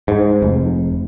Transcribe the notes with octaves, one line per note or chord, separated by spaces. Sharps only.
G#2
F1